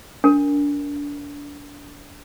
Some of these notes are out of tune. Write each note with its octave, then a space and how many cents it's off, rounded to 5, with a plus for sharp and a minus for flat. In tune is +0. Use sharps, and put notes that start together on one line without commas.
D4 -30 A#4 +0